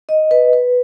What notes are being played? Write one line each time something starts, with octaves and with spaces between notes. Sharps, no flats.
D#5
B4
B4